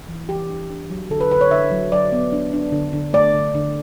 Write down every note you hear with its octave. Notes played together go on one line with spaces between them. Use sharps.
E3
E3 G4
D4
D4
F#3
D3 A4
B4
D3 B4
C#5
D3 E5
F#3
F#3 D5
B3
D4
D4
D3
D3
A3 D5
D3
D3